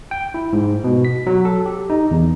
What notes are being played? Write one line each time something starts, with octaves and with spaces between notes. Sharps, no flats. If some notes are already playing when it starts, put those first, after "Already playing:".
G5
E4
G#2
B2
B6
F#3
A4
G4
D#4
E2